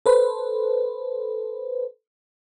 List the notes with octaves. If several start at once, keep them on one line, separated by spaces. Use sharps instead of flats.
A4 B4 C5